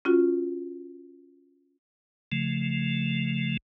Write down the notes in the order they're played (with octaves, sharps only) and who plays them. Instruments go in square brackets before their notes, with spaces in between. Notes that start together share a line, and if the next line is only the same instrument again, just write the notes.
[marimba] C#4 F4 F#4
[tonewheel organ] C#3 F3 A3